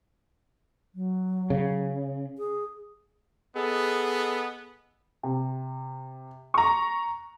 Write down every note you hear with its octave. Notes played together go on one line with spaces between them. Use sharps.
F#3
C#3
G#4
B3 G#4 A4 D#5
C3
A#5 C#6